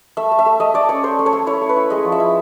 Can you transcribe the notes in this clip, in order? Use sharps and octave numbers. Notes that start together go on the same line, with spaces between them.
A3 E5
A3
E5
A3
A3 D#5
A3 D5
C#4 C#5
A3 C5
A3
C#5
A3
E4 C#5
A3
B4
E4
G#3 D#5
F3
E5
E4